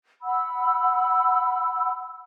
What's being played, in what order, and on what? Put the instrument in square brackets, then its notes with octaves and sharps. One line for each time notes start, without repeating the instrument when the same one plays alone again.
[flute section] F#5 B5 E6